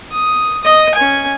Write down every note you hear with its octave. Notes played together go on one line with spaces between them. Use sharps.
D#6
D#5 D#6
C#4 G#5